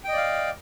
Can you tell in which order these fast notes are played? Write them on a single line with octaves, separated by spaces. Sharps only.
G5 D#5 D5 F5